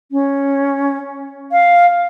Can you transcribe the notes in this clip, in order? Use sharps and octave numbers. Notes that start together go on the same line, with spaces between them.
C#4
F5